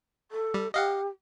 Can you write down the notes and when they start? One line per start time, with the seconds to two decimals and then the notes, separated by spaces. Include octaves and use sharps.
0.31 A4
0.54 G3
0.74 G4 D#5 F5 F#5